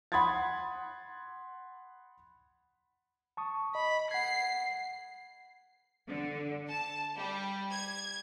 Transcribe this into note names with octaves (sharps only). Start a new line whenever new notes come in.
F#5 B5 C6 D#6 G#6 A6
A5 C#6 D#6
D#5 B5
F#5 G#6 C7
D3
A5
G3
G#6